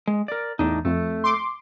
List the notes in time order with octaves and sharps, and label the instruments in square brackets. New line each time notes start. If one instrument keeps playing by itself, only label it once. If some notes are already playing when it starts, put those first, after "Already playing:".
[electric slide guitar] G#3
A#4 D5
[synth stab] E2 [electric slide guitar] A2 D4 D#4
[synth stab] F2 [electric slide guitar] A3
[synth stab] C6 D6